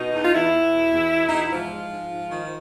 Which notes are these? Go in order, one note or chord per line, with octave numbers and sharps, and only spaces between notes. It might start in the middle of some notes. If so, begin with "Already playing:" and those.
Already playing: B2 D#4
E2
F4
E2 E4
E2
B2
E2
B2
E2 D#4
E4
G#2 F3 F4
G#3
G#2
G#2
D#3